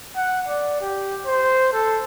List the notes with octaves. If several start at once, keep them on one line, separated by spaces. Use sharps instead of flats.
F#5
D5
G4
C5
A4